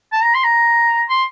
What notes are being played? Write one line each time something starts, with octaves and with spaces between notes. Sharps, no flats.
A5
A#5
C6
A#5
C6